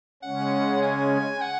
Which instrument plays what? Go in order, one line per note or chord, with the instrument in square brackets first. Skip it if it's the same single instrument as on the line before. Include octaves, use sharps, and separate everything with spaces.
[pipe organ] C#3 G#3 C#4 [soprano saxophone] F#5
[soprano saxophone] G#5
F#5